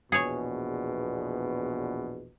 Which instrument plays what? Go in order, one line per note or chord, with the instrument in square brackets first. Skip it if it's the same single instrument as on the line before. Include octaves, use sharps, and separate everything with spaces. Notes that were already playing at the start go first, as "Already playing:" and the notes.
[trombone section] A#1 E2 B2 [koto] G#4 C#5